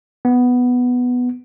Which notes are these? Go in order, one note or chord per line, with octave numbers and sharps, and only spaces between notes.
B3